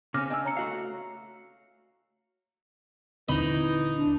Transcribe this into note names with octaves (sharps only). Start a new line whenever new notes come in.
C#3 C4 C#4 D6 F6 A#6
C#3 D4 D#5 G#5 E6
C#5 A#5 C#7
A3 F#4 F5
D#1 D3 E3 C4 D#4 D#5 B5
D4